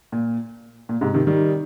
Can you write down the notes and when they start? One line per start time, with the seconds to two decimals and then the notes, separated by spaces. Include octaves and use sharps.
0.12 A#2
0.89 A#2
1.01 G#2 C3
1.14 C3 D#3
1.27 D#3 G3